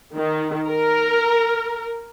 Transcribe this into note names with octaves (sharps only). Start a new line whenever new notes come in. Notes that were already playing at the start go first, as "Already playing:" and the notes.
D#3
A#4